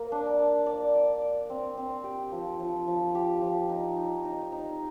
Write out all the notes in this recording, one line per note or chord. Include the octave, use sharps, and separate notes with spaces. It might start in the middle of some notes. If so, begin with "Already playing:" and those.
Already playing: A#3 A#4
D4
D5
D5
D5
D5
C4
C4
G4
F3
F3
F3
G4
F3
D#4
D#4
D#4
D#4